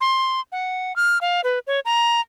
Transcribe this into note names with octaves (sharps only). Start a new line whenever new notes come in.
C6
F#5
F6
F5
B4
C#5
A#5